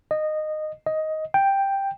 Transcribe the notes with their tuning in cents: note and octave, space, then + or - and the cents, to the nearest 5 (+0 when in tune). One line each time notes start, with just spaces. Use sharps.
D#5 -15
D#5 +10
G5 +5